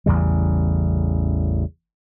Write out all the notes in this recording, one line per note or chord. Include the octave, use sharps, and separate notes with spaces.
A1 E2 C#3 G3